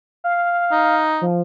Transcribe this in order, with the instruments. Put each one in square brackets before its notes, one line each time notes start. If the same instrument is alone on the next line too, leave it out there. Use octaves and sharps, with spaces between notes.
[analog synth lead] F5
[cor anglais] D#4
[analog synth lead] F3